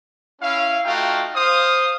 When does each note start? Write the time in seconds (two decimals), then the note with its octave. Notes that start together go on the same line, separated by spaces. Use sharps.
0.42 C#4 E4 F5
0.85 A3 D#4 F4 F#4 F5 G5
1.35 C5 F5 D#6